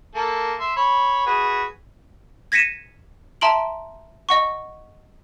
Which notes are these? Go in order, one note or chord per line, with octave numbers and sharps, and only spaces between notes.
A#3 A4
E5 C6
C#5 B5
F#4 G#4 B4
G#6 A#6 B6 C#7 D#7 E7
E5 A5 A#5 C6 D7 F#7
D#5 F#5 C#6